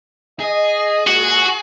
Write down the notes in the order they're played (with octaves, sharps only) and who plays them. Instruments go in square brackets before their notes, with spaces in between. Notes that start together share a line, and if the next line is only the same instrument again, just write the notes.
[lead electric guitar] G#4 [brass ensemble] D#5
[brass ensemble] A#2 G#3 [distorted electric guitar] F#4